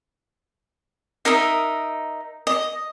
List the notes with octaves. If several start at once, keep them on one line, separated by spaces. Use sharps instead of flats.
D#4 A#4 D#5 E5
D#5